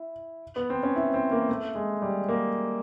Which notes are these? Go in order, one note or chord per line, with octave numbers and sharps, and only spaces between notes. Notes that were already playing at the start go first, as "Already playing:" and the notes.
Already playing: E4
B3
C4
C#4
E4
C4
A#3
A3
G#3
G3
A#3